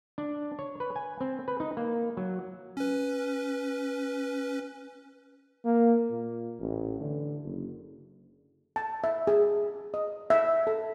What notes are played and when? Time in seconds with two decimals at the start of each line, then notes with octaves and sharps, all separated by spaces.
0.18 D4
0.59 C#5
0.80 B4
0.96 G#5
1.21 C4
1.48 B4
1.60 D#4
1.77 A#3
2.17 F#3
2.77 C#4 B4
5.65 A#3
6.10 A#2
6.60 A1
7.01 D3
7.43 F#1
8.76 A5
9.04 E5
9.27 G#4
9.94 D#5
10.30 E5
10.67 A4